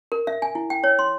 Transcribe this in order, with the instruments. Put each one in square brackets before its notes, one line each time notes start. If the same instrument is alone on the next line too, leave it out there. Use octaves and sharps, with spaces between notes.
[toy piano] A#4
E5
G#5
E4
G5
C#5
C6